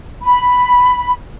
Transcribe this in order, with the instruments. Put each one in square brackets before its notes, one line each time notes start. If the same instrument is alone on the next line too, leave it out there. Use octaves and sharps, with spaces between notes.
[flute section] B5